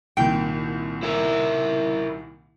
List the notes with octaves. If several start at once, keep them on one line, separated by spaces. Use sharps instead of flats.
C2 A#2 D#3 G5
E4 A#4